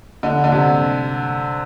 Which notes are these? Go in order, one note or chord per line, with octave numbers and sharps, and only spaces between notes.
D3
D3
C3